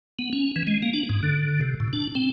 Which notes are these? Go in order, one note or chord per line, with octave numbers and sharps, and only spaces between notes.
B3
C#4
E3
G#3
A#3
D4
G#2
D3
C3
A2
D4
C4